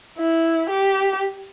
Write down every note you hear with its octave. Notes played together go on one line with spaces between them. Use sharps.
E4
G4